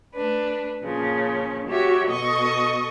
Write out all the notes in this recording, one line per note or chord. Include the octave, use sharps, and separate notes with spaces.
A3 D4 B4
A#2 C#3 F3 C#4
F#4 G4 C#5 E5
B2 A4 D#5 C#6 D#6